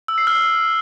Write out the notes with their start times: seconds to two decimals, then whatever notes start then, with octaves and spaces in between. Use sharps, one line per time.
0.08 E6
0.18 C7
0.27 F6